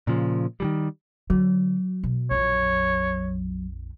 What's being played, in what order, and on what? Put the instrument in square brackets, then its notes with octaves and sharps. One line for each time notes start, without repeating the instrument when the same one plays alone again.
[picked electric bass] A#2 C#3 F3
D#3 E3 G3
[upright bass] D3 [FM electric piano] F#3
[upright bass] B2
[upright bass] A#1 F2 [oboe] C#5